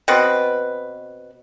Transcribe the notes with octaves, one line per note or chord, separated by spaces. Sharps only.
B2 C4 B4